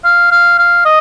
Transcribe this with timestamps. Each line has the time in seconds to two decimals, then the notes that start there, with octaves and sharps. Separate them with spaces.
0.04 F5
0.31 F5
0.58 F5
0.85 D#5